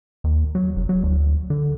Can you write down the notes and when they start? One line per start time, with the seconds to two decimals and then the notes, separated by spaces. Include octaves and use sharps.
0.24 D#2
0.55 F#3
0.76 F1
0.89 F#3
1.03 D2
1.50 D3